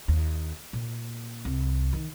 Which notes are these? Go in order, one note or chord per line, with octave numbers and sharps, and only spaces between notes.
D#2
A#2
C2
D#3